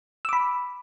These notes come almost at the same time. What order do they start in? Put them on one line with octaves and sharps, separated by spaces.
E6 D6 B5